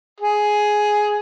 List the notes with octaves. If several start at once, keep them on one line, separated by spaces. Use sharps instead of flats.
G#4